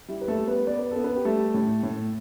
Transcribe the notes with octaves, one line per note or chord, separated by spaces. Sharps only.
G3 E4
B4
A3 A4
G3
B3 B4
B3 D5
B4
B3 A4
B3 B4
G4
G3 A3 A4
A2
A2